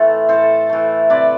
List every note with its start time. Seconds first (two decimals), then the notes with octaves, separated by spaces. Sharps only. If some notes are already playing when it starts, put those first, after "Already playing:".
Already playing: A2 E3 A3 F4 A4
0.29 A2 A4 C5
0.69 E3 A3
1.10 C3 B4 D5